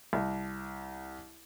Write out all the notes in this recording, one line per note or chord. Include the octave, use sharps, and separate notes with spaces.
C2